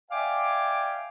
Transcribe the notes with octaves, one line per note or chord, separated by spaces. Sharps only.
D5 E5 F5 G5 G#5 D6